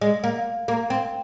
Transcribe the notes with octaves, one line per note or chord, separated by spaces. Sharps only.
G#3
A#3
A#3
C4